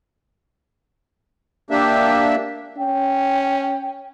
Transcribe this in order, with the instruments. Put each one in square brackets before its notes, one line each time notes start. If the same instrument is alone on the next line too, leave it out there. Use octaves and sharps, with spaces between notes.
[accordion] A#3 D4 E5 [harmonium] G4
[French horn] C#4 [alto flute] G5